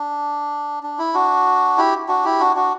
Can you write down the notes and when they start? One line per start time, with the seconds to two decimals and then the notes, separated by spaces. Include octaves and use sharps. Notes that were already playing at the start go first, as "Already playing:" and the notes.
Already playing: D4
0.83 D4
0.99 E4
1.14 D4 F#4
1.77 E4 G4
2.09 D4 F#4
2.24 E4 G4
2.40 D4 F#4
2.56 D4 F#4